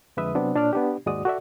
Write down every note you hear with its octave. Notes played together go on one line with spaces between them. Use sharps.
F2 D3 G#3 B4 E5 D#6
C3 F#3 B3 C4 D4
A#2 D4 C#5 D5 F6
B3 D4 G4
D#2 G#2 G#3 F#4 D5 D#6
F#4 A4 D5 E5